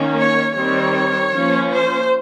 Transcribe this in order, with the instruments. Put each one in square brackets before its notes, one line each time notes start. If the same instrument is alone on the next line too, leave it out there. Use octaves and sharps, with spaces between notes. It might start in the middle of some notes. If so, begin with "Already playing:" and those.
Already playing: [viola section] D#3 A#3 C#4
C#5
D#3 G3 C4 C#5
F3 A#3 C#4
C5